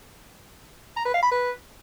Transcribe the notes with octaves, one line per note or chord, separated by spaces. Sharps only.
A#5
B4
F5
B5
B4